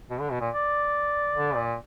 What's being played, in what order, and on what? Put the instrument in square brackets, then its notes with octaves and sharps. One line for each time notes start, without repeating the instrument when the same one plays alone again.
[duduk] B2
D3
B2
A#2
[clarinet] D5
[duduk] D3
A#2